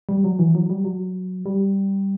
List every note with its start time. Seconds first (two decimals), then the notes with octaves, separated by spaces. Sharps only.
0.09 G3
0.24 F#3
0.39 E3
0.55 F#3
0.70 G3
0.85 F#3
1.46 G3